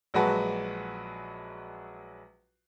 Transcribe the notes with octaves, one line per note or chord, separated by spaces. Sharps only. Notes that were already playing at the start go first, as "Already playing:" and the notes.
A#1 F#3 G#3 F#4 B4 A5